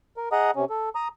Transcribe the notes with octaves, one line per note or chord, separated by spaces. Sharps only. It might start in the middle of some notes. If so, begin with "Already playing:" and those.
A#4
G#4 D#5 F#5 A#5 D#6
C3 C#4
A4
A#5 D#6